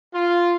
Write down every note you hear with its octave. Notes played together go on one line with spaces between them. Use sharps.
F4